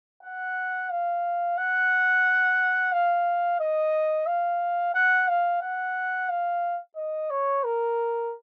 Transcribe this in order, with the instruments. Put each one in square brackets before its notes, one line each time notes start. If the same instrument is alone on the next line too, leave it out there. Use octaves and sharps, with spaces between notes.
[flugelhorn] F#5
F5
F#5
F5
D#5
F5
F#5
F5
F#5
F5
D#5
C#5
A#4